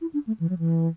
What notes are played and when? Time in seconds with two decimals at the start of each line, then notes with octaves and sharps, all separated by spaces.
0.01 E4
0.13 D4
0.27 A3
0.40 E3
0.49 F#3
0.58 E3